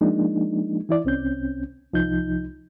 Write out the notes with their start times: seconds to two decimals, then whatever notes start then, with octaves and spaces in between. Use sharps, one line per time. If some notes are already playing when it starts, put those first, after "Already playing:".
0.01 F3 G#3 A#3 D4 D#4
0.89 E3 E4 D5
1.05 C2 C4 C#4 G6
1.93 C2 F3 D#4 G6